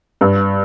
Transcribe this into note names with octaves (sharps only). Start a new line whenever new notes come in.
G2